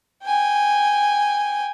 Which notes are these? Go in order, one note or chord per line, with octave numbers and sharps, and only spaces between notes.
G5 G#5